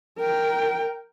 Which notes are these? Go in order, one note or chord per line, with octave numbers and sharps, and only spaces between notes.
A#4 G5